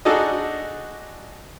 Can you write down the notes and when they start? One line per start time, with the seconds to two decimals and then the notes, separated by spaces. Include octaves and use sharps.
0.05 D4 D#4 F#4 G#4 A4 D#5